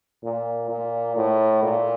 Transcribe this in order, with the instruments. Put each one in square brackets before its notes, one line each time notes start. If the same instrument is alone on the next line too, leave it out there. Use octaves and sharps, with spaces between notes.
[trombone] A#2
A#2
A2
A#2